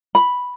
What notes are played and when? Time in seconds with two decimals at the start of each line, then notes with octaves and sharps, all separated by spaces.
0.15 B5